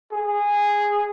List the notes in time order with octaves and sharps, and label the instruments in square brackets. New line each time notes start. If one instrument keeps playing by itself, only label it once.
[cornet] G#4